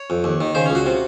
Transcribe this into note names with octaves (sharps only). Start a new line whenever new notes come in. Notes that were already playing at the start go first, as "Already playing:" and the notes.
Already playing: C#5
F2
D#2
D#3
C#3 C5
C#4
C#2
F#4
C3